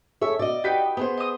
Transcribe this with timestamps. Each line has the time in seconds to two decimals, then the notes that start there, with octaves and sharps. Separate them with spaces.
0.21 G#4 A4 C#5 E5
0.39 B2 D5 D#5
0.64 D#4 F#4 G4 B4 G5 B6
0.97 B3 G#4 C5
1.17 D#5 D#6